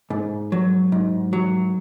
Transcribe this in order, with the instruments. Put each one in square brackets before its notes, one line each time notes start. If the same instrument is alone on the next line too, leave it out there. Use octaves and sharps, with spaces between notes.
[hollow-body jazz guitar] G#2
F#3
G#2
F#3